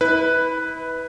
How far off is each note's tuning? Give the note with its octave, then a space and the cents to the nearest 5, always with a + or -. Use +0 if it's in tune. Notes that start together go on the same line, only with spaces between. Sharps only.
E4 -35 B4 +0